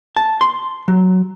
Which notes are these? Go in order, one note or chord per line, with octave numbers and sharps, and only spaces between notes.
A5
C6
F#3